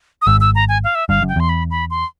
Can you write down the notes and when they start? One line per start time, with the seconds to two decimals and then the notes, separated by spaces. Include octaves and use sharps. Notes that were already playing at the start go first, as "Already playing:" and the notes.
0.22 D#6
0.27 G#1 G#2 E6
0.41 E6
0.55 A#5
0.69 G#5
0.84 F5
0.95 E5
1.09 G1 G2 F5
1.22 F#1 F#2
1.29 G5
1.36 E2 C6
1.49 B5
1.71 B5
1.90 C6